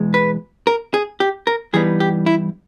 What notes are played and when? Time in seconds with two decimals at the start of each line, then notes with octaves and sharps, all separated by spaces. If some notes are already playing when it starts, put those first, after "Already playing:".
Already playing: E2 B2 G#3
0.14 B4
0.67 A#4
0.94 G#4
1.20 G4
1.47 A#4
1.73 G2 E3 G3 B3 D#4 G#4
2.00 G4
2.26 E4